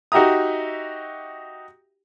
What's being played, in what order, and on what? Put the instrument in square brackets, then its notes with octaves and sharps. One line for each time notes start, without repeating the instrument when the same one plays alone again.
[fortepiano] D#4 F#4 G4 E5 A#5 D#6